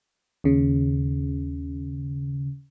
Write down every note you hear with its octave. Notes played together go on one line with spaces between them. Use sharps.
D#2 C#3